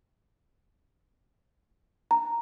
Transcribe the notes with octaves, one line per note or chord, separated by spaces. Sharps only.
A#5